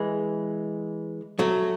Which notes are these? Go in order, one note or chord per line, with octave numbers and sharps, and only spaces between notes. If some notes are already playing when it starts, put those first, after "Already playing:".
Already playing: E3 G#3
F#3 A3